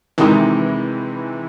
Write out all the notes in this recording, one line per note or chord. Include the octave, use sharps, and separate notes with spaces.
C3 D#3 E3 G#3 D#4